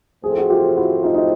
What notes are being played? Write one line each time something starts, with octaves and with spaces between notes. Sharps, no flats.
A2 F3 A3 C4 G#4
A4
F#4 G#4
F4 G4
E4 F#4
D#4 F4
D#4